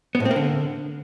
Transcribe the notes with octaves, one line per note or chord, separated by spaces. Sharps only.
B3
A2
C4
A#3
D3